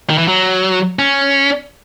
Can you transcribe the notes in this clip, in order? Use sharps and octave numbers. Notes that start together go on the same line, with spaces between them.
D#3
E3
F#3
C#4